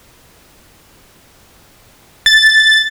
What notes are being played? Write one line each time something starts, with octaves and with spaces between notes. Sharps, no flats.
A6